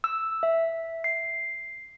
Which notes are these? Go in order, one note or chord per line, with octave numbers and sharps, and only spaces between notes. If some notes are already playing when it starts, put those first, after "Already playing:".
E6
E5
C7